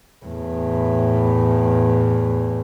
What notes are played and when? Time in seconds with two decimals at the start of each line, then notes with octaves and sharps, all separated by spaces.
0.26 E2 A2